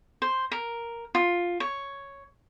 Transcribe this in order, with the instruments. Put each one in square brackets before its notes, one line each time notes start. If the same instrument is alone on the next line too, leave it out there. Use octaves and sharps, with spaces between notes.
[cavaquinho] C5
A#4
F4
C#5